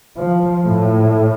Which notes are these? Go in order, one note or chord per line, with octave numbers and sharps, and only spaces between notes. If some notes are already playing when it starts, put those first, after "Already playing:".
F3
A2